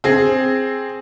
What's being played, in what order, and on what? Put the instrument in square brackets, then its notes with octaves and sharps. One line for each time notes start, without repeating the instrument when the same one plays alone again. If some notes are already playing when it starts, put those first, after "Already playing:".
[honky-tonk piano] C4 G#4